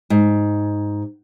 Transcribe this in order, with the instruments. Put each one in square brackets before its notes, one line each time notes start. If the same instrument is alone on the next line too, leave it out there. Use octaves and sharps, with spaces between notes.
[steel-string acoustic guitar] G#2